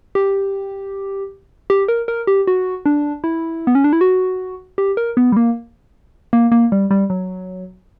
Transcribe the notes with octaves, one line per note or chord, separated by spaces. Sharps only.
G4
G4
A#4
A#4
G4
F#4
D4
E4
B3
C#4
D4
E4
F#4
G4
A#4
B3
G3
A#3
A#3
A#3
G3
G3
F#3